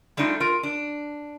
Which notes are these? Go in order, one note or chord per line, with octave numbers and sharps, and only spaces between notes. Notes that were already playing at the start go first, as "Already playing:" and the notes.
G3 A3 D4 D#4 F4
F4 A#4
D4